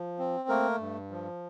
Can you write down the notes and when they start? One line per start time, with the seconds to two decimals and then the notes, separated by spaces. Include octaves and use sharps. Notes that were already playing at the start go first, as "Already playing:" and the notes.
Already playing: F3
0.19 C4
0.49 A3 A#3 A#4
0.80 G2
1.11 F3